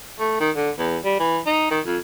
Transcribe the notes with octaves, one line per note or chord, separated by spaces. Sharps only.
A3
D#3
D3
E2
G3
E3
D#4
D#3
F2